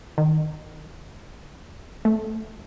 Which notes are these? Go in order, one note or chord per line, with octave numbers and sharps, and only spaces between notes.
D#3
A3